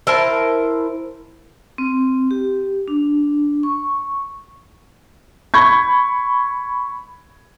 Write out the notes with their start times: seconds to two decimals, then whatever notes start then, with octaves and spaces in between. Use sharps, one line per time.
0.07 E4 A#4 C5 A5
1.78 C4
2.31 G4
2.88 D4
3.63 C#6
5.54 B5 C#6 G#6